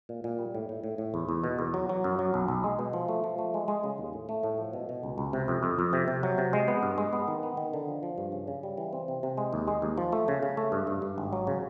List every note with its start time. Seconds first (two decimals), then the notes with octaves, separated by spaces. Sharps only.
0.09 A#2
0.24 A#2
0.39 G3
0.55 A2
0.69 A2
0.84 A2
0.98 A2
1.14 E2
1.29 E2
1.44 B2
1.59 E2
1.74 F#3
1.89 F#3
2.04 F#2
2.19 F#3
2.34 B1
2.48 B1
2.64 G#3
2.79 B2
2.93 F3
3.08 A3
3.24 F3
3.38 A3
3.54 G#3
3.68 G#3
3.84 C#3
3.98 D#2
4.13 A2
4.29 A3
4.43 A2
4.58 F3
4.73 B2
4.89 B2
5.03 C#2
5.18 C#2
5.33 C3
5.48 F2
5.63 F2
5.79 F2
5.93 C3
6.08 C3
6.23 F#3
6.38 C3
6.53 G#3
6.68 B3
6.83 G2
6.98 G#3
7.13 B3
7.28 D#3
7.43 B3
7.57 D#3
7.74 D3
7.88 F3
8.03 F3
8.18 G2
8.32 C#3
8.48 C#3
8.63 G3
8.78 E3
8.93 C4
9.08 C3
9.23 C3
9.37 G#3
9.53 D#2
9.68 G#3
9.82 D#2
9.98 F3
10.13 A3
10.28 C#3
10.43 C#3
10.57 A3
10.72 G2
10.87 G2
11.02 G2
11.18 G#1
11.33 F#3
11.47 C#3